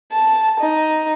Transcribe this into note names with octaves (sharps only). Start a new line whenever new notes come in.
A5
D#4